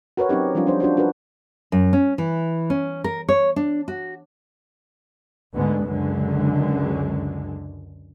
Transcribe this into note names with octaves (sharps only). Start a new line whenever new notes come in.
F#4 A#4 B4 C#5
F#3 C4 C#4 D#4 G4
F3 G3 C#4 D4 F4
D4 C5
D4 F4 F#4 C5
D4 F#4 A#4 B4
F#2
C#4
E3
C#4
A#4
C#5
D4
F#4
D2 G#2 D3 G#3 B3
C#2 F#2 D3 G#3